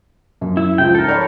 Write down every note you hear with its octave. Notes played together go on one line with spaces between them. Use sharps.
F#2
E4
C#2 F3 G5
G#2 A4 A#4
C#5 D5 B5